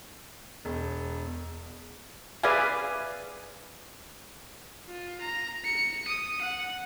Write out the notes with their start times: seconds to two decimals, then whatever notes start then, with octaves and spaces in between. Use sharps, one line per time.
0.65 E1
2.43 G#4 B4 D5 E5 F5 G#5
4.88 F4
5.21 A#5
5.65 C#7
6.08 D#6
6.41 F#5